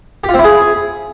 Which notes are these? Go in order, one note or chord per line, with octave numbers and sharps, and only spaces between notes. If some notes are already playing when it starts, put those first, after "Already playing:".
G4
F4
C4
E4
G#4